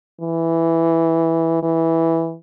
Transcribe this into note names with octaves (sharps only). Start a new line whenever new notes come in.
E3
E3